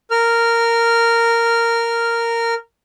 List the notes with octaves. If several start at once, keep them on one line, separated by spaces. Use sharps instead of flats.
A#4 F6